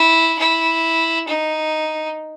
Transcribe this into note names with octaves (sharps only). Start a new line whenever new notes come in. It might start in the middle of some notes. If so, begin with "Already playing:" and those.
Already playing: E4
E4
D#4